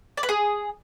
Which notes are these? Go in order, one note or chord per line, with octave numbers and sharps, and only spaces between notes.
D5
B4
G#4